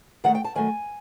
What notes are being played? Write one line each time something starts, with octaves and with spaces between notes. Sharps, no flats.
D#3 F#3 A3 F#5
G5
A5
D#3 F#3 A3 G#5